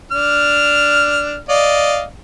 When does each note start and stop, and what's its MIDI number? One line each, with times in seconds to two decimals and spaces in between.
0.12 1.39 62
0.12 1.39 89
1.49 2.03 74
1.49 2.03 75
1.49 2.03 77